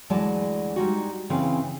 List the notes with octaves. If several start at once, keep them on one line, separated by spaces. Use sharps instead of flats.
D2 E3 F#3 G#3 D5 A5
G3 G#3 D#4 F#4
C#3 E3 C4 C#4 B4 F5